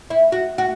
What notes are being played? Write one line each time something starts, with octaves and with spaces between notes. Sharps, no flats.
E4
F#4
F#4